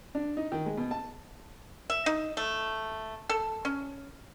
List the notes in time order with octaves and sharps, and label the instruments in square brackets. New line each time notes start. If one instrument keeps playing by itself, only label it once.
[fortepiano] D4
D#4
D#3
G#3
B2
A5
[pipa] E5
D#4
A3
A4
C#4